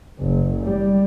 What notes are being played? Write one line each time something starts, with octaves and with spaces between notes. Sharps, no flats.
F#1
G3